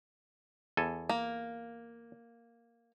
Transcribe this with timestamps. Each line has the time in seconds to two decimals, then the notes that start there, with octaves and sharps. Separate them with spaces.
0.77 E2 A4 G#5
1.09 A#3